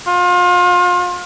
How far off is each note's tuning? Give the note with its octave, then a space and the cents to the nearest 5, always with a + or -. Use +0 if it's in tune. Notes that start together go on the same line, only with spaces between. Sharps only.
F4 +35